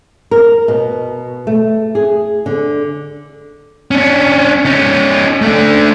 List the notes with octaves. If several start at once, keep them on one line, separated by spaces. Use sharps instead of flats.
A#4
B2
A3
G#4
D3
C#4 D4
C#4 D#4
A3 D4